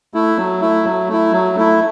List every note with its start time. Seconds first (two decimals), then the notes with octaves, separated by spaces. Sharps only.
0.14 A3 E4
0.37 F#3
0.61 A3 E4
0.85 F#3
1.09 A3 E4
1.32 F#3
1.56 A3 E4